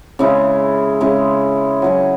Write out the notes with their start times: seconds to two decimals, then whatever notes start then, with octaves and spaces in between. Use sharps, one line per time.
0.19 C#3 G#3 E4
1.01 C#3 G#3 E4
1.82 F#3 E4 G#4